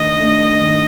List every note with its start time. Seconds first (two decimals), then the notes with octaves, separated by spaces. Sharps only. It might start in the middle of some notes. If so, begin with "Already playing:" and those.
Already playing: D#3 A3 D4 D#5
0.19 A3 D4
0.61 D#3